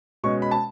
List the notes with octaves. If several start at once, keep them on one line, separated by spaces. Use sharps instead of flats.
B2 G#3 C#4 C#6
B5
A5